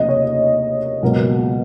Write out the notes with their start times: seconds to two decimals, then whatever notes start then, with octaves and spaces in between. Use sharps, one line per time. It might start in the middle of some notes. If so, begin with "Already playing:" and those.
Already playing: F1 D#2 C#3 F3 A#3 D#5
0.09 C#5
1.02 C#2 B2 F#3 A#3